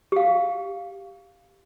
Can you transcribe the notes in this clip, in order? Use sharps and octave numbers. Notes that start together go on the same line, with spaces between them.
G4 F5